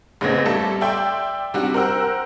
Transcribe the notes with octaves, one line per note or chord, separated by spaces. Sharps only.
A1 C#3 B3 C4 G#6 A#6
G3 A3 A#3 A4 E7
D5 E5 G5 C6
C3 G3 D4 F#4
A#4 C5 F#5 G5 E6 F#6